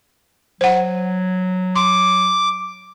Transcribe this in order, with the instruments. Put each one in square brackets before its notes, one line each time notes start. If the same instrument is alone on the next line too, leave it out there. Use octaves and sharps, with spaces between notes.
[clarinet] F#3 [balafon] C5 F#5
[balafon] C6 [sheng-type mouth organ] D6